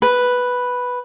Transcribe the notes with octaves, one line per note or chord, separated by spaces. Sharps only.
B4